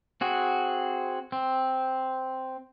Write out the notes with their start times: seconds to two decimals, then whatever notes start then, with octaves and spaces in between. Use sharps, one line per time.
0.21 C4 F#4 G#4
1.32 C4